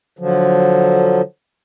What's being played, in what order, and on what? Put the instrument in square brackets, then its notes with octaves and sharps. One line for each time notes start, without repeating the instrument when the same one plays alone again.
[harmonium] D3 F3 F#3